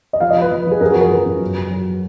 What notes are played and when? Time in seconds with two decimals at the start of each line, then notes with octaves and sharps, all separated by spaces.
0.13 D#5
0.20 F3 F5
0.30 D#5
0.36 F3
0.42 B4
0.51 F3
0.67 F3 G#4
0.81 F#2 A#4
0.86 G#4
0.91 F#4
0.96 F3 A#4
1.11 F3 B4
1.26 F#2
1.41 F#3
1.56 F#3
1.71 F#3